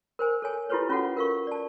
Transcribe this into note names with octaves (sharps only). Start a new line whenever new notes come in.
A#4 C5 G#5
A4 C#5 G#5
E4 F4 G4 A4 B4 C#5
C#4 F4 F#4 A4 F#5
A#4 F5 C#6
D5 A5